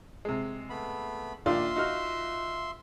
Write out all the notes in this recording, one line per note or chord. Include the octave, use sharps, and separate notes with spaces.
C3 G#3
A3 B3 B5
A#2 D#3 D4 F4 E5 C6
D#4 F#4 F6